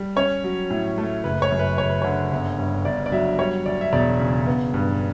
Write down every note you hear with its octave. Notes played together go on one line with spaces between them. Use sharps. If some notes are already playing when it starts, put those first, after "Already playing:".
Already playing: G3
C#4 C#5
F#3
A2
A3
F#1 B4
C#5
F#2
B4
F#1 C#5
B4
D3 C#5
G1
G2
G1 D5
D5
F#3 E5
G3 C#5
D2 D5
E5
E1 D5
C#3
B3
G2